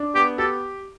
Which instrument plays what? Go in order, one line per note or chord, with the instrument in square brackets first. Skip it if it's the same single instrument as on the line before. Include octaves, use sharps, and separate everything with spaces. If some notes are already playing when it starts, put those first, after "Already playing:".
Already playing: [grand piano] D4
[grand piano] B3 [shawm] G4
[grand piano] G4 [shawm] A4